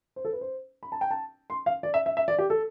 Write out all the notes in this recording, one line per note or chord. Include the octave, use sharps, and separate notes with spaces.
C5
A4
B4
C5
B5
A5
G5
A5
C6
F5
D5
E5
E5
E5
D5
G4
A4